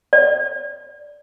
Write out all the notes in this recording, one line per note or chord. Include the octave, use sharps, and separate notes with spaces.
D5